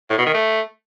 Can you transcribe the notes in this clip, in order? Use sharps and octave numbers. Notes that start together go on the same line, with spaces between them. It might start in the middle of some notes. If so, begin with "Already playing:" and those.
A2
B2
D#3
A3